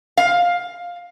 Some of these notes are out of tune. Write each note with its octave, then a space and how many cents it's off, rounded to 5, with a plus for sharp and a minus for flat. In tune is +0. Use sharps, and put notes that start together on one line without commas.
F5 +10